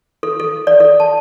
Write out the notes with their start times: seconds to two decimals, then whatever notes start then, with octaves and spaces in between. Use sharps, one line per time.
0.23 A4
0.40 A4
0.67 D5
0.80 A4
1.00 A5